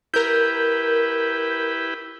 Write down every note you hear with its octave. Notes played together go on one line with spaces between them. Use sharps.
E4 G4 A#4 B4 G6